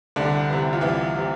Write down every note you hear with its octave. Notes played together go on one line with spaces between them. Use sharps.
C2 D3 D4
C3 E3
F4
C2 E3 E4
C3 E3